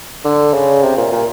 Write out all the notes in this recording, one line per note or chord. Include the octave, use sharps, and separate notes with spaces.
D3
C#3
C3
A#2
A#2